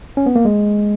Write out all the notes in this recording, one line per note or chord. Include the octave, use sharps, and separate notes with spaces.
C#4
B3
A#3
G#3